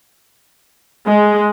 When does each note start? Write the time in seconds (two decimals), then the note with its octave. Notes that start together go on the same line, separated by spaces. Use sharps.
1.06 G#3